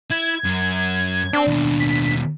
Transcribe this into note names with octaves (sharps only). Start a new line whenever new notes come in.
E4 G#6
F#2
C4 D4
D#2 B2
B6